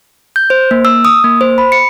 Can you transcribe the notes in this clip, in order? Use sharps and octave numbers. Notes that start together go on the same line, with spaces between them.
G6
C5
A#3
E6
D#6
A#3
C5
B5
C#7